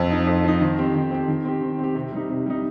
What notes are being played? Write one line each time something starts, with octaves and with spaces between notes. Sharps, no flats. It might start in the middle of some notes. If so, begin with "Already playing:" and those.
Already playing: F2
F3 D#4
F2
F3 D#4
D#3
C4 G4
D#3
C4 G4
D#3
C4 G4
D#3
C4 G4
C3
G3 D#4
C3
G3 D#4